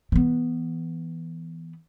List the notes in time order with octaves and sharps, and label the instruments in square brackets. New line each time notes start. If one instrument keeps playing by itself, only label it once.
[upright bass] E3 B3